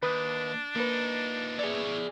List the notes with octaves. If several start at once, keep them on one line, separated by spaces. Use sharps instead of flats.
D#2 D4 B4 D#6 F#6
F3 A#3 D#4 B4
E4 G#4 C#5 D5